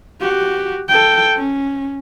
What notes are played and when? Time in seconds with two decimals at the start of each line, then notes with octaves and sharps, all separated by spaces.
0.21 F#4 G4
0.89 A4 G5
1.36 C#4